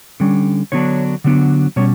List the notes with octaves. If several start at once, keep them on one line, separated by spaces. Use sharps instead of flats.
D3 G3 C#4
D3 F#3 B3 D4 C#5
D3 F#3 B3 D4
B2 G3 C#4 C#5